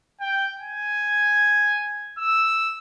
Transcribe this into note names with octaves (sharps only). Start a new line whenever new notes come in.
G5
G#5
E6